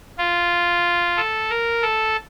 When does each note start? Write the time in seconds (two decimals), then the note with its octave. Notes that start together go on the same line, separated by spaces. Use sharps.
0.18 F4
1.17 A4
1.50 A#4
1.82 A4